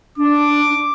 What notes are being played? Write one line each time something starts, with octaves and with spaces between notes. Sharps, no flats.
D4 D6